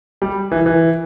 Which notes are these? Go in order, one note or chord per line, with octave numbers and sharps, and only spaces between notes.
G3
E3
E3